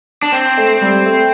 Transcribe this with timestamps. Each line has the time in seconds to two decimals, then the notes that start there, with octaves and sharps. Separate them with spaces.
0.23 D4
0.32 C4
0.57 A3
0.81 G3
1.06 A3